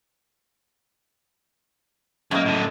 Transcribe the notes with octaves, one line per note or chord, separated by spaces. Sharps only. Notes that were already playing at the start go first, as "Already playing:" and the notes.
F#2 G#3 A#3 D#5
A2 D3